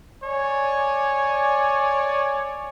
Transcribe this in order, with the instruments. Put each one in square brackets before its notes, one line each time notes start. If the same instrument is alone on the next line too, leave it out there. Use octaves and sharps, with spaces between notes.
[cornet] C#5 [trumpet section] D5 G#5